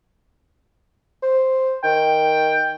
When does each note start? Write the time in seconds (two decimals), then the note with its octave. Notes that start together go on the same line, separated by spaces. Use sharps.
1.23 C5
1.84 D#3 G5